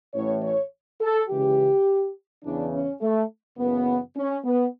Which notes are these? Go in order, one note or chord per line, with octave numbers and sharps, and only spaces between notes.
A1 A2 E3 C#5
C#5
A4
C#2 C#3 E3 G4
E2 C#3 E3 D4
C#4
A3
F#1 F#2 C#3 E3 B3
C#4
B3